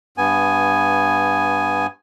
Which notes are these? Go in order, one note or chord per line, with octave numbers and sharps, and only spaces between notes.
G2 B3 G#5